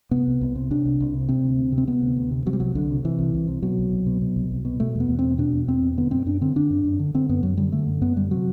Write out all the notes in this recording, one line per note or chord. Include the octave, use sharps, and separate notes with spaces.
C3 B3
C2
C2
C3
C3 D4
C2
C2
C3
C3 C4
D2
D2
C3
C4
C3 B3
D2
D2
C3
C3 F#3
G3
C2 F#3
C2 D3
C3
C3 E3
C2
C2
C3
B2 F#3
C2
C2
B2
B2
C2
C2
B2
B2 A3
E2 B3
E2
B2 C4
B2 D4
E2
E2 C4
B2
D3 B3
F#2 C4
F#2 D4
D3 C4
D3 D4
F#2
F#2
D3
D3 C4
F#2 B3
F#2 F#3
D3 G3
D3 A3
F#2
F#2 B3
D3 G3
C3 F#3